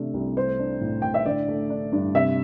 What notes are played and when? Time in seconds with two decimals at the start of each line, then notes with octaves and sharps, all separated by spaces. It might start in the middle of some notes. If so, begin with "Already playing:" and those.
Already playing: C3 A3 D4
0.14 C2
0.37 A3 C5
0.59 D4
0.81 A2
1.02 A2 G5
1.14 E5
1.26 D3 D5
1.48 A3
1.70 D4
1.92 G2
2.15 C3 E5